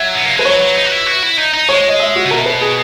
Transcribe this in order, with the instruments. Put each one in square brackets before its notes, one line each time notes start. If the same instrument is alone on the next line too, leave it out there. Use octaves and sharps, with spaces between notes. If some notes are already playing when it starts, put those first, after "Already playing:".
Already playing: [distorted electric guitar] F#3 [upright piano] E5
[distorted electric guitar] B3
A#3
[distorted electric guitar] G#3 [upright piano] B4
[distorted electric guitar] F#3 [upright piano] C#5
[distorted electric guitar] F#3
D#4
F#4
E4
F#4
E4
D#4
D#4
[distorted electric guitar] G#3 [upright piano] C#5
[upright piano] D#5
E5
F#4
[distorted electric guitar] C#3
[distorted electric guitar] B2 [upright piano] A#4
[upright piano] B4
G#4